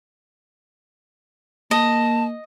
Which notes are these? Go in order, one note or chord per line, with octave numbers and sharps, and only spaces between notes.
A#3 D#5 A5